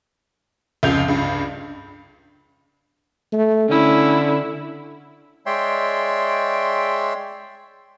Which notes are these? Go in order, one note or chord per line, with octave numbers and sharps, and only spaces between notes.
F1 C#2 G6 F7
C#2 G2
A3
D3 C#4 E4
G#3 C#5 D5 E5 G5 C6